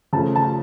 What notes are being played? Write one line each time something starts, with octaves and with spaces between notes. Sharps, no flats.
C#3 F3 A3 A5
A5